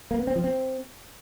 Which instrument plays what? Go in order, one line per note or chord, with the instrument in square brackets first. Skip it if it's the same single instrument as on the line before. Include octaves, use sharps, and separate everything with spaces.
[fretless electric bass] A#3
B3
C4
F3
C4